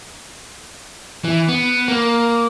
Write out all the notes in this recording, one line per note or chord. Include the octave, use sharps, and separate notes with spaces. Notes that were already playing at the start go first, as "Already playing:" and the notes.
E3
B3
A#3